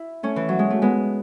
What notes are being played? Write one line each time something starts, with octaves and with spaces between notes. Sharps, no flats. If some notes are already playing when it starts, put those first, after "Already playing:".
Already playing: E4
A3 C#4
E3
F#3
G#3
A3
G#3 B3